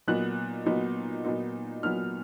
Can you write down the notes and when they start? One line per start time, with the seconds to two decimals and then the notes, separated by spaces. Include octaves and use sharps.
0.07 A#2 F#3 B3 D#4 F#6
0.66 A#2 F#3 B3 D#4
1.25 A#2 F#3 B3 D#4
1.83 A#2 F#3 B3 D#4 F6